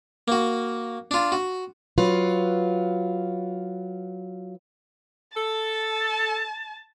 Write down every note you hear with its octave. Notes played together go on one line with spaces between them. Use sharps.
A#3 F#4
D4 F4
F#4
F#3 F4 B4
A4 A5